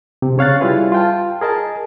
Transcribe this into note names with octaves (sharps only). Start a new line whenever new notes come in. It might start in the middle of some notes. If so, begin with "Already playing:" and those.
C3
C#3 C#5 F5 F#6 A6
G3 E4 F4 G#4 B4 F5
F4 G5 A5
G#4 A#4 D#5 A5